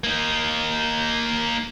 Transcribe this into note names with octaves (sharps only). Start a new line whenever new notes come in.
A#3 D#4